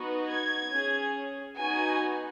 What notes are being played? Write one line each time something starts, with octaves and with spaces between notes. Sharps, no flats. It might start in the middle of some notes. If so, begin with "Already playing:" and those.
Already playing: B3 D#4 F#4
G#6
C#4 G#4
B3 D#4 F#4 G#5